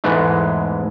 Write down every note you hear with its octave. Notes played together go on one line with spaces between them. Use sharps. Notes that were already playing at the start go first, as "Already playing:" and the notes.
E2 G#2 E3 G#3 A3